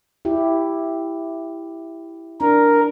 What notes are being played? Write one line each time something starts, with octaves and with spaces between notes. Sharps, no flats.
E4 G4
D4 A#4